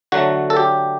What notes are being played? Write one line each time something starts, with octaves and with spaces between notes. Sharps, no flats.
D3 F#3 A3 F#4
A4
G4